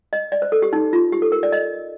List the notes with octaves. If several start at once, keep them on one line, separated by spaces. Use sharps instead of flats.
D#5
D5
C5
A4
G4
D#4
F4
G4
A4
A#4
D5
D#5